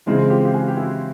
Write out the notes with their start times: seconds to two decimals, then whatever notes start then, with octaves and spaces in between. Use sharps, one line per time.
0.06 C#3 E3 G#3 C4 D#4 F4
0.30 F4 G4
0.45 G4
0.54 F#4 G#4
0.68 G4
0.77 E4 F#4